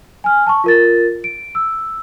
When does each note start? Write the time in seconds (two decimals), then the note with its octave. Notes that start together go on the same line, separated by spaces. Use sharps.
0.24 G#5 F6
0.47 A5 C#6
0.64 F4 A#4 A6
1.24 D7
1.55 E6